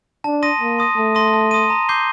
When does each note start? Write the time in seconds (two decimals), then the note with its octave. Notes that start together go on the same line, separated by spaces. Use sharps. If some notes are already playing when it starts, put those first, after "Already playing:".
0.24 D4 A5
0.42 C6 D#6 A#6 D#7
0.61 A#3 A5
0.78 C6 D#6 A#6 D#7
0.97 A3 A5
1.15 C6 D#6 A#6 D#7
1.33 A5
1.51 C6 D#6 A#6 D#7
1.70 A#5
1.89 D6 G6 C7 G7